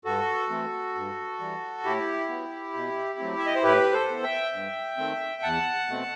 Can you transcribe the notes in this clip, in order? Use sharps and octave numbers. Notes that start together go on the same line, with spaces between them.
G2 F#4 A4
E3 A3 C4
G2
E3 G3
A2 E4 G4
F#3 B3
B2
F#3 A3 C4
E5
D#5
C5
A2 G4 B4
A4 C5
E3 B3
E5 G5
G2
D#3 A3 C4
E2 F#5 A5
B2 A3 C4